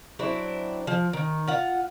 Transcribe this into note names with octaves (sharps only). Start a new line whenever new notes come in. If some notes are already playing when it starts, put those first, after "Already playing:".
F#3 C4 D4 E4
F3
D#3
F4 F#5